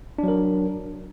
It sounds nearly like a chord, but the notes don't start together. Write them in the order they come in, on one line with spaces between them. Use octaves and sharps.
D4 F#3 A#4